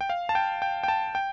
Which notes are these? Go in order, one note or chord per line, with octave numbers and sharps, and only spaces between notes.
G5
F5
A5
G5
G5
G5
A5
G5